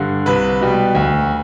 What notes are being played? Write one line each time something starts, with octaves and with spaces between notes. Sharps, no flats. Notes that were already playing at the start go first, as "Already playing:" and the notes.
Already playing: G2 D3
C2 B4
B2 G3
D2